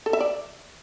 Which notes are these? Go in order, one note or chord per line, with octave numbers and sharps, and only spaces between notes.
A4
E5
D5